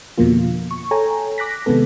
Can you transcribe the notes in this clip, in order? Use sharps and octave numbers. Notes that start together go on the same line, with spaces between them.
F2 B2 D3 F3 A#3 F4
C#6
A4 C#5 G5 G#5 A#5
D6 F#6 A#6 B6
C3 D#3 G#3 B3 A4